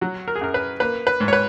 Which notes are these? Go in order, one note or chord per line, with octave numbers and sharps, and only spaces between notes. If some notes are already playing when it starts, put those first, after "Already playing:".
F#3 F#4
A#4
G#4
F#2 A#4
B4
A#3 B4
B4
G#2
C#5
B4